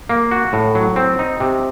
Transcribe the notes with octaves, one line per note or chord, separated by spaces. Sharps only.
A#3
F#4
A2
F#3
C4
D#4
C3